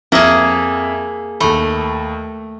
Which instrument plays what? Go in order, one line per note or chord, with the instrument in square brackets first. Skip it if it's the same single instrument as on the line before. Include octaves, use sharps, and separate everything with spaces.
[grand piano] F2 E5 A#6 [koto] A#3 G#4
[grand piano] D#2 B5 [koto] A3